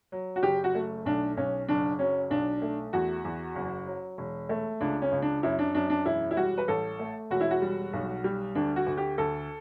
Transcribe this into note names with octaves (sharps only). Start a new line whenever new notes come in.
F#3
F#4
F#1 G4
F#4
A3
B1 D4
B1 C#4
F#1 D4
F#3 C#4
B1 D4
A3
E2 F#4
E2
F#1
F#3
E1
A3
C#2 D4
C#4
C#2
D4
F#2 E4
D4
F#2 D4
D4
E1 E4
E4
G3 F#4
B4
A1 A4
A3
E1 F#4
E4
F#4
G3
B1
G3
D2 D4
F#4
D2
G4
D2 A4